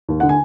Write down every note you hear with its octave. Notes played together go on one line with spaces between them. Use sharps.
D#2
D3 F#5
G#5